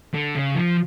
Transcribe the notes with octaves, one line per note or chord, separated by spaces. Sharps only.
D3
C#3
F3